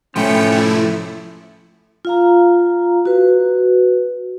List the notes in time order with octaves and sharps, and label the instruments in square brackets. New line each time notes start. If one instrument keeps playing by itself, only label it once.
[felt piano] A2 [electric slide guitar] F3 A3 [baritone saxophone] C#4 [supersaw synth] G5
[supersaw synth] E4
[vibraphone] F4 F5 A#5
F#4 B4